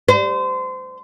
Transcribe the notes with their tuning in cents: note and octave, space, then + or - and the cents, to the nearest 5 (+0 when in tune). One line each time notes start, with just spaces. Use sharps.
C5 -30